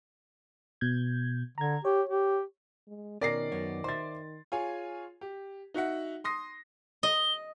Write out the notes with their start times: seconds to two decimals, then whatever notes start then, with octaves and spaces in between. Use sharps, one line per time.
0.81 B2 G6 G#6
1.58 D3 A#5 G#6
1.85 G4 C#5
2.09 G4
2.87 G#3
3.21 B2 D#3 C#4 A#4 D5 A#6 C7
3.52 F#2 B3 C#5
3.84 C5 E5 C6 A6
4.52 F4 G#4 C#5 G#5
5.21 G4
5.74 D#4 F#4 E5 F#5
6.24 C6 D#6 A#6 C7
7.03 D#5 G7